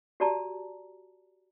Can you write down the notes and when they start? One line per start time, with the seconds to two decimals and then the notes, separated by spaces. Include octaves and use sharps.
0.20 F#4 G4 D5 A5 A#5